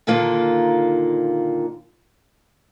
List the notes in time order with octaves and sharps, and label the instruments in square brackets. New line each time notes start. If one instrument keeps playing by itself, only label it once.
[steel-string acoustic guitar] A#2 D3 D#3 A#3 F4